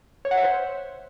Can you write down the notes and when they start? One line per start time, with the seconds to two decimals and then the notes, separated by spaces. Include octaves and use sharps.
0.25 C#5
0.31 F#5
0.37 E5
0.43 C5